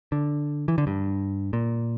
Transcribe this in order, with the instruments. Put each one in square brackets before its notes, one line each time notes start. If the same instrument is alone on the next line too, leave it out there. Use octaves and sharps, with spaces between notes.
[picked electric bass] D3
E3
D3
G2
A#2